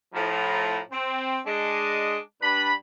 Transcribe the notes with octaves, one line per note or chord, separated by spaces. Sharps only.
A2 F3 A#5
C4
G#3 D4 D#5
G2 D4 B4 B5